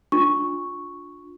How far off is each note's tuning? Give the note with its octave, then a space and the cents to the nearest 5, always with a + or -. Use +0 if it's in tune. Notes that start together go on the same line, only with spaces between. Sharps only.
D4 +0 F4 +25 C#6 +0